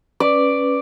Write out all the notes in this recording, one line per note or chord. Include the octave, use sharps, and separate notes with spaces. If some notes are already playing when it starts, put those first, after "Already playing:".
C#4 B4 D5